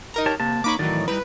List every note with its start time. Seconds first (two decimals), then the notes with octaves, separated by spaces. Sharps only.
0.14 D#4 A#4 A#5
0.26 G4 C#5 A5
0.40 C3 A#3 A5
0.64 A#3 D#4 C#5 B5 D6
0.79 A2 D#3 E3 F#3 D#4 D5
1.08 G3 D#4 E4 B4